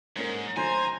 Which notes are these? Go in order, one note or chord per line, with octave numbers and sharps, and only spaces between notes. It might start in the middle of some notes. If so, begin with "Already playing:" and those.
G#2 A#3 C#4 A#4
D2 D#3 F#3 C5 G#5 A#5